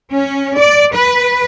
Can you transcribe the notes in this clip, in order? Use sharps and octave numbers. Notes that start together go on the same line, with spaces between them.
C#4
D5
B4